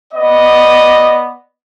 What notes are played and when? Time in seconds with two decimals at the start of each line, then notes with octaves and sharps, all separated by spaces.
0.14 B3 D5 D#5